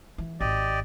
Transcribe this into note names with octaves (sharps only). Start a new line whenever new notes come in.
E3
G#1 G4 D5 D#5